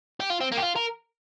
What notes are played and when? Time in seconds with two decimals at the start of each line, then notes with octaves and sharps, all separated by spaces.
0.20 G4
0.30 F4
0.41 C4
0.52 A#3
0.57 G4
0.62 F4
0.76 A#4